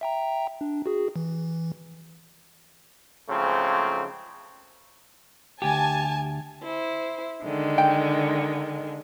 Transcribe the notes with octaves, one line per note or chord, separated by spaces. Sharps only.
E5 G5 A#5
D4
F#4 G#4
E3
G#2 C#3 F3 F#3 A3 C4
D2 G4 G#5 A5
E4 C5
D3 D#3 G#3
G5